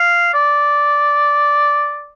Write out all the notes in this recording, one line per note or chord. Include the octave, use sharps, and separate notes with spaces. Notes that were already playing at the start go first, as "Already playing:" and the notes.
Already playing: F5
D5